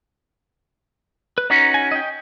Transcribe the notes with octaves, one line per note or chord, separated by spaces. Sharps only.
B4
C#4 D#4 F#4 A#5
G#5
D#5 G5